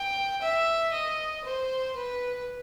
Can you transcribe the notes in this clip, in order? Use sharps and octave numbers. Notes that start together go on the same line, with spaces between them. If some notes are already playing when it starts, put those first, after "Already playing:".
Already playing: G5
E5
D#5
C5
B4